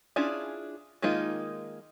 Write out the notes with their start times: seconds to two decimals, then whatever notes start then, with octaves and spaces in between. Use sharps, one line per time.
0.16 C#4 D4 E4 F4 G#4
1.02 D#3 G#3 A#3 D#4 F4